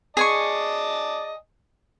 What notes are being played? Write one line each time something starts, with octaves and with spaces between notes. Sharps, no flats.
G#4 D5 D#5 G#5 A5 C#6